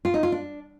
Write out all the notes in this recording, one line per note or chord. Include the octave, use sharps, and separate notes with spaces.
F4
D#4
F4
D4